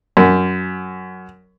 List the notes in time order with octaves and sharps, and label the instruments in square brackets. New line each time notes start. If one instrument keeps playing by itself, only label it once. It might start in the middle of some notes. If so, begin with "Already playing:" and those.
[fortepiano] F#2